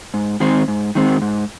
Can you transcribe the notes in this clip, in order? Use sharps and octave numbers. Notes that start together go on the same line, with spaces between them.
G#2
D#3 G#3 C4
G#2
D#3 G#3 C4
G#2